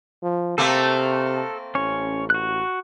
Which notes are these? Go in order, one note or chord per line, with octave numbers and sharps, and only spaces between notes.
F3
C3 A3 A#3 C4 A4
A1 C#4 C#5
F#4 F#6